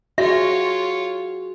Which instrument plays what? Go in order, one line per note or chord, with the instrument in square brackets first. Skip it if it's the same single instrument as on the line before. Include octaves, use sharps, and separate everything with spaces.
[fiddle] F4 C#5 [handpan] F#4 G#4 [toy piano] E5